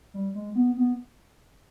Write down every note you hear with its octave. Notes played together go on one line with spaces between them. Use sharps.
G3
G#3
B3
B3